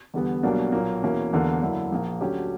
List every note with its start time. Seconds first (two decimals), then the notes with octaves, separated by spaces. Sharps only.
0.14 E2 D3 G3 B3
0.43 B1 B2 G3 A#3 D4
0.72 B1 A#2 A#3
1.03 E2 B2 A#3 C#4 E4
1.31 E1 E2 D3 A#3
1.62 F#2 D3 A#3 E4
1.92 A#1 A#2 A#3
2.21 D2 D3 F#3 C#4 G4